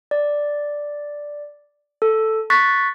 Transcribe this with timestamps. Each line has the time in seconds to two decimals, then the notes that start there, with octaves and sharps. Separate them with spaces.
0.11 D5
2.02 A4
2.50 C#6 F#6 A6 B6